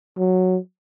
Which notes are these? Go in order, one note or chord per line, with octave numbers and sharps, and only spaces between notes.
F#3